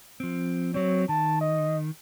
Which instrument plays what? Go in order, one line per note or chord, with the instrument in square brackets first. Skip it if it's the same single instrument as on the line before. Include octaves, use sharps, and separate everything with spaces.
[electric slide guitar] F3 C4
[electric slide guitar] F#3 C4 [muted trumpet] C#5
[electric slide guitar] D#3 [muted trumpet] A5
[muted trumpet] D#5